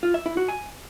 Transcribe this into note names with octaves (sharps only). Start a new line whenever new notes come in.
F4
E5
E4
F#4
G#5